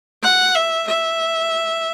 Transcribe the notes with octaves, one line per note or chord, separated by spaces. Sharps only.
F#5
E5
E5